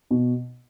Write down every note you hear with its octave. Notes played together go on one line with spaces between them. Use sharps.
B2